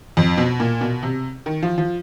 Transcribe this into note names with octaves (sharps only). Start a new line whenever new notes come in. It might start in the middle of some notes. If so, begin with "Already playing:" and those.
F2
B2
A#2
B2
C3
D#3
F3
F3